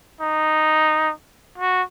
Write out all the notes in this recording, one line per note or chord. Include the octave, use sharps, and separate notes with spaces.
D#4
F#4